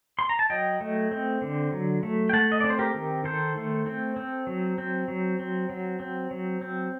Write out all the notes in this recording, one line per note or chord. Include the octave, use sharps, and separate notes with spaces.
C6
A#5
A5
F#3 D#5 G5
A3
C4
D3
F#3
A3
G5
A3 F#5 A5
D#5
C4 D5
C5
G4 A#4
D#3
D#3 A4 C5
A3
C4
C4
F#3
C4
F#3
C4
F#3
C4
F#3
C4